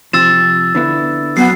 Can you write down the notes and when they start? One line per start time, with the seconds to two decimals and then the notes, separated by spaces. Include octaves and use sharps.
0.13 C3 F3 E6 A6 E7
0.75 D3 B3 E4
1.37 F#2 F#3 B3 C7